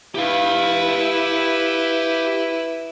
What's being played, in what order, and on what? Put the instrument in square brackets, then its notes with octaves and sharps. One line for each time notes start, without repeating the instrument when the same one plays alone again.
[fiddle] E4 B4 [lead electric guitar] G4 F5